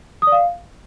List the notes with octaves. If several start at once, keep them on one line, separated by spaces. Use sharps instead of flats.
D#6
D5
F5